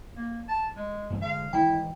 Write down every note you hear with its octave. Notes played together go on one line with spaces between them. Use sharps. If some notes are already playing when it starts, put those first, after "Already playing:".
A#3
A5
G#3
A1 G2
D3 G#3 F5
D#3 E3 G#3 E4 G5